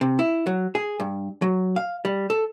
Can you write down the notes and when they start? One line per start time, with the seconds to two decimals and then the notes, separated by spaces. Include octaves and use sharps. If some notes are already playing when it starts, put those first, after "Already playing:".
0.01 C3
0.19 E4
0.47 F#3
0.75 G#4
1.00 G2
1.42 F#3
1.76 F5
2.05 G3
2.30 A4